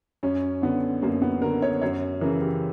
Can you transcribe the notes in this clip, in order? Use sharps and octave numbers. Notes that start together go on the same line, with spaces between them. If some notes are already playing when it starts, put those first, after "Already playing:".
F#2 C#4
D3 B3
F#2 A#3
B3
D3 A#4
C#5
F#2 C#5
C#3 E3 A#4
G4